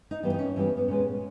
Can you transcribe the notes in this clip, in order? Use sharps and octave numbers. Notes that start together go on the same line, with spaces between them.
D#4
G2 E3 G3 A#3 B3
D#4
C#4
G2 E3 G3 B3
B3
A#2 G#3 B3 C#4